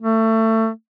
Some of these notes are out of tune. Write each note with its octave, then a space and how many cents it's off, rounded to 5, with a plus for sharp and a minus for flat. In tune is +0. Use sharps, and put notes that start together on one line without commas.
A3 +25